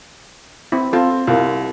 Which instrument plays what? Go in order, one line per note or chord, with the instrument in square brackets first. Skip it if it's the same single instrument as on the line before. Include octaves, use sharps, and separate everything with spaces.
[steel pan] C4 E4
[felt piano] C4 [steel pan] F4 A4
[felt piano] C2 [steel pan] F4 A#4